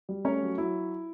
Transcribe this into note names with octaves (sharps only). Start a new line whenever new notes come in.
G3
A3 C#4 C#5
F#3
F#3 E4